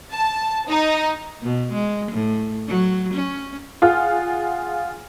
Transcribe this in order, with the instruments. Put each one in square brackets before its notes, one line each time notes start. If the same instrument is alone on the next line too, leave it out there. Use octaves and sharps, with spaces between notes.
[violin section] A5
D#4
[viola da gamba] B2
G#3
A2
F#3
C#4
[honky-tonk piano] F4 G#4 F#5 F6